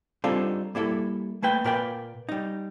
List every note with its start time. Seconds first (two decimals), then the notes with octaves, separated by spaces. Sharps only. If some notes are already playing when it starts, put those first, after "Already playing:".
0.24 G3 C4 D4 D#4 F4 A4
0.75 G3 A#3 E4 A4
1.42 A3 A#3 B4 G5
1.64 A#2 A#3 A#4 B4 D5 G5
2.29 G3 D#4